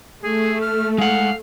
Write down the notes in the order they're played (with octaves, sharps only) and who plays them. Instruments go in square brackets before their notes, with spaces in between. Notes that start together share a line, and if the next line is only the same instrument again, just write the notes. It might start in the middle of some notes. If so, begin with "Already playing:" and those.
[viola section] A3 [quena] G#4
[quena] F6
[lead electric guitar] G#3 F#5 [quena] F5